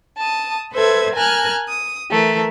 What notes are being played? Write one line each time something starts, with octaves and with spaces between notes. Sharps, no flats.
A5 D#6
A4 B4 C5 E5 G#6
A#4 G#5 A5 F6 F#6
D#6
E3 A3 A#4